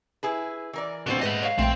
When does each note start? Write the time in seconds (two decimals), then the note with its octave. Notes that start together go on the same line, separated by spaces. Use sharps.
0.23 E4 G#4 B4
0.73 E3 A#4 D5
1.07 D#2 A#2 D3 C4 F#4 B4 C5
1.21 G#2 A3 B4 D#5 F#5
1.43 C#5 F5
1.59 A#1 A3 C4 G5